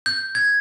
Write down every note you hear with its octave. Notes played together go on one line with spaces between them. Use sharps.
G6
G#6